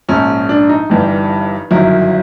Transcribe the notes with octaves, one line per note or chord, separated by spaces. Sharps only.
A#1 G#2 F3 C#4
D4
D#4
G1 G2 E3 G3
G1 F#2 D#3 F#3 E4